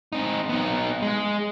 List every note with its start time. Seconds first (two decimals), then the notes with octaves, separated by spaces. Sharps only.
0.13 C4 D#4
0.49 B3 D#4
1.02 G#3